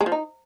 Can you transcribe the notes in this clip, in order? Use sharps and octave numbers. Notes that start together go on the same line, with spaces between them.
G#3
F3
D#4